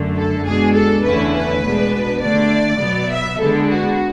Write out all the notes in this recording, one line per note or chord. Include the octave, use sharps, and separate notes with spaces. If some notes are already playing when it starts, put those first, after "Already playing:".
Already playing: F#2 D3 A3
A4
B2 G#3 D4 G#4
A4
E2 D3 A3 C#4 E4 B4
B4
B2 G#3 D4
D3 A3 D4 D5
B2 F#3 B3
E5
D3 G#3 B3 D4 A4
F#4